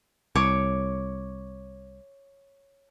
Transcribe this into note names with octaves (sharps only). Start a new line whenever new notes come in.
C2 C#5 D6